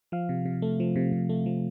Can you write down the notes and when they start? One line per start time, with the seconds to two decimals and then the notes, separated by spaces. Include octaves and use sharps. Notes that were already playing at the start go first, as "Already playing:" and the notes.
0.12 F3 F5
0.29 C3
0.46 C3
0.62 A3
0.80 F3
0.96 C3
1.12 C3
1.29 A3
1.46 F3